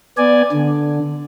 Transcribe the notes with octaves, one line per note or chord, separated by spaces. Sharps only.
B3 D5 G#5
D3